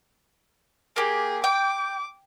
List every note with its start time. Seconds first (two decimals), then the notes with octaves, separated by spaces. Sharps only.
0.96 A#3 G4 G#4
1.44 G5 D6